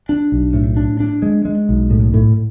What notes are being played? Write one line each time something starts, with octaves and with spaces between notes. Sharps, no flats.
D4
B1
A2
D4
D4
G#3
G#3
B1
A2
A2